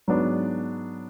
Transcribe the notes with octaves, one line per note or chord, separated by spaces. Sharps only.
G#2 F#3 B3 D4